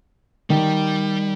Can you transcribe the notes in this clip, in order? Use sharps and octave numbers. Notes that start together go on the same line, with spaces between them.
D#3 G3